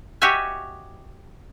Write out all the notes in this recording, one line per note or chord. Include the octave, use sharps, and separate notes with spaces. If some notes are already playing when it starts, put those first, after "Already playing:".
F#4 G4 C#5 D#5 E5 G#5